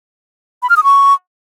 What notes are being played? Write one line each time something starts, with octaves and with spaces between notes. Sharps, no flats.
B5
F6
D#6
C#6